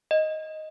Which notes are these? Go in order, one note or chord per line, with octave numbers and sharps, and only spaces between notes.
D#5